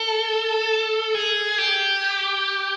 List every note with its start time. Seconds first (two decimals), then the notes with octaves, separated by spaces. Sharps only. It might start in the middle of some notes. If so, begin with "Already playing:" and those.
Already playing: A4
1.15 G#4
1.58 G4